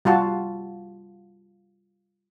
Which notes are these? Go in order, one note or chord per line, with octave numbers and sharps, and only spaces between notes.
G3 F4 F#4 A5